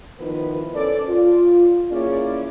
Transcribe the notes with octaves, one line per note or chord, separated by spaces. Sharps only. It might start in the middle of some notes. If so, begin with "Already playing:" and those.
D#3 F3 B3 E4 A#4 B4
C#4 A4 C5 D5
F4
A#3 C#4 E4 G#4 C#5 D5